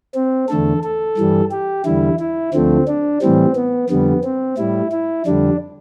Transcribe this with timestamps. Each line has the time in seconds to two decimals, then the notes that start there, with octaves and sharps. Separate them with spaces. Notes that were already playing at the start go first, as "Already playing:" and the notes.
0.15 C4
0.49 E2 D3 A3 A4
0.84 A4
1.18 G2 E3 G3
1.51 G4
1.85 E2 D3 G3 E4
2.20 E4
2.54 D2 D3 F3 A3 C4
2.88 D4
3.22 A2 E3 G3 C4
3.56 B3
3.89 F2 D3 G3 B3
4.24 C4
4.58 A2 G3 E4
4.92 E4
5.26 F2 D3 G3 D4